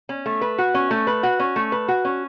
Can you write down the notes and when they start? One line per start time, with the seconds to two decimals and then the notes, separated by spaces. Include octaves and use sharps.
0.09 C#4
0.26 A3
0.41 B4
0.59 F#4
0.74 C#4
0.91 A3
1.07 B4
1.23 F#4
1.40 C#4
1.56 A3
1.72 B4
1.88 F#4
2.05 C#4